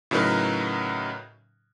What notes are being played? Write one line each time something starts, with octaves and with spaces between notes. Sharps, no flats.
A2 C#3 F#3 D#4 A#4 B4